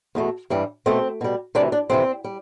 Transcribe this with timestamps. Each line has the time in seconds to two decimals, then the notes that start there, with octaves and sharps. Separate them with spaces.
0.15 E2 B2 A3
0.50 G2 E3 G3
0.86 B2 A3 C4
1.21 B2 G3
1.55 D2 C3 E3 D4
1.72 D4
1.89 F2 C3 E3 C4
2.24 G3